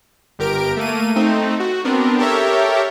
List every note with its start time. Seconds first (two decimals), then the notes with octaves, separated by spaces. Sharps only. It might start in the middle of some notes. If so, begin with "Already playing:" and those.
0.39 G1 G4 A#4 D7
0.77 A3 A#3 D#7
1.16 A3 C4 D#4
1.60 F#4
1.85 B3 C4 D4 A#4
2.19 G4 A4 A#4 C#5 E5